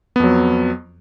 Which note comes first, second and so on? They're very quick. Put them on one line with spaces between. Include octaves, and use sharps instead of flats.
B3 F2 F#3